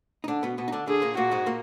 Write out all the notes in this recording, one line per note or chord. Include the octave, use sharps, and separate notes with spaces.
D#4
D3 D4
B2 B3
B2 B3
D#4
D3 D4
D3 D4 G#4
A#2 A#3
A#2 A#3 F#4
G#2 G#3
A#2 A#3